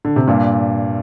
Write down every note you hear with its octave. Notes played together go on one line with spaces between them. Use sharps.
D3
C3
G2 A#2